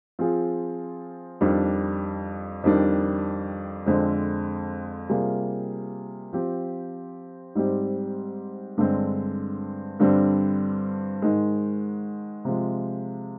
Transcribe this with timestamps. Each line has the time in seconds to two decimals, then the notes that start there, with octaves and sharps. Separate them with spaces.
0.19 F3 C4 F4 G#4
1.41 F2 D#3 G3 D4
2.64 F2 D#3 G3 D4
3.86 F2 D3 G#3 C4
5.09 C3 G3 A#3 F4 G#4
6.33 F3 C4 G4
7.55 G#2 G3 C4 G4
8.77 G2 D3 G#3 C4
10.00 G2 D3 G3 C4
11.22 G#2 D#3 G#3
12.45 C3 F3 G#3